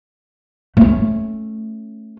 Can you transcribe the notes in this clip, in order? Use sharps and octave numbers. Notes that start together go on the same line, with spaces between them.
A3 C#4